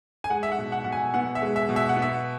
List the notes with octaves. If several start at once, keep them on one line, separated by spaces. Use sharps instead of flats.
G#5
G#3 F#5
E5
F#5
B2
F#5
B2 F#5
G#5
B3 F#5
E5
G#3
E5
B2
E5
F#5
B3
E5